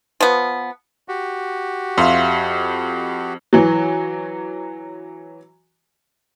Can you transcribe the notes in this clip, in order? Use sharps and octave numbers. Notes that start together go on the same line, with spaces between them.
F3 B3
F#4 G4
F2 E5 F5 C6
E3 F#3